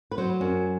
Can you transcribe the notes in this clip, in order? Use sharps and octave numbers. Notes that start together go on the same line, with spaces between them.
B4
F#3 C5
F#2